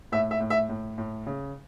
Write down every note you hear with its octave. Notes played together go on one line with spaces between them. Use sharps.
A2 E5
E5
A2
E5
A2
A2
C#3